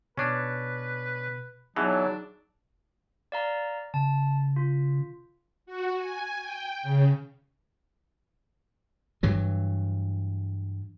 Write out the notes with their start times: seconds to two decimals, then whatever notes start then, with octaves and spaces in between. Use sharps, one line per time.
0.17 B2 C#4 D4 B4
1.76 B2 E3 F#3 D4 D#4 G#4
3.32 D5 F5 A#5
3.94 C#3 A5
4.56 F4
5.66 F#4
5.96 G#5
6.41 G5
6.83 C#3
9.23 G2 E3 F#3